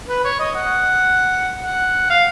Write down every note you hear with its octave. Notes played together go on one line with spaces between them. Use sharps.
B4
C#5
D#5
F#5
F#5
F5